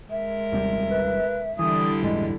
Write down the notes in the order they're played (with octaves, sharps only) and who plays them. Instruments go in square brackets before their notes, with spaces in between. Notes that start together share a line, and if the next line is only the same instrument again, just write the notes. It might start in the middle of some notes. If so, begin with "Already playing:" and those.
[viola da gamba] G#3 A#4 [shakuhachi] E5
[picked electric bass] D#2 C3 G3
[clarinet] B4
[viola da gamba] D3 G3 E4 [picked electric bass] E3 [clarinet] D#6
[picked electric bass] A#1 E2 G#2 [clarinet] G#3